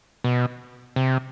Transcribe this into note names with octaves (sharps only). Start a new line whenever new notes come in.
B2
C3